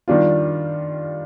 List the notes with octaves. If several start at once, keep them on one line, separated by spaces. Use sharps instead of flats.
D#3 G3 D4 F4